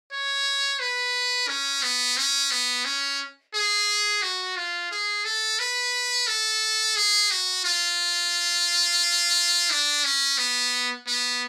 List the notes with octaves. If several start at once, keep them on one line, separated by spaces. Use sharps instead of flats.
C#5
B4
C#4
B3
C#4
B3
C#4
G#4
F#4
F4
G#4
A4
B4
A4
G#4
F#4
F4
D4
C#4
B3
B3